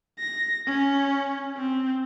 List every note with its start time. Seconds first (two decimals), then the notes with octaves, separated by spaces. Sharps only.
0.19 A#6
0.67 C#4
1.57 C4